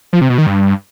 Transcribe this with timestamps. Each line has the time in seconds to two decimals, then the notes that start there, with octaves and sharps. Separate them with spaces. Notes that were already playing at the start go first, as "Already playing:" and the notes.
0.13 F3
0.21 C3
0.30 B2
0.38 D#3
0.47 G2